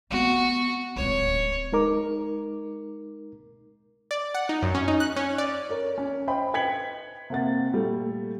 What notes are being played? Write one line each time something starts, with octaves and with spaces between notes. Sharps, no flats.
A3 B3 F#4
D1 C#2 C#5
G#3 D#4 A#4 D6
D5
F#5
D#4
F#2
C#4
D#4
F#6
C#4
D5
A#4 C#5
C#4
C5 D#5 G5 B5
B4 G5 G#6 B6 C#7 F#7
C3 A#3 F#5 A6
A#2 G3 A3